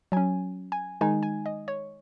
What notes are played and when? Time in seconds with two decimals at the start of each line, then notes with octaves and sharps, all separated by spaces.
0.12 F#3 C#4 G#5
0.72 G#5
1.01 D#3 G#3 D#4 G#5
1.23 G#5
1.46 D#5
1.68 C#5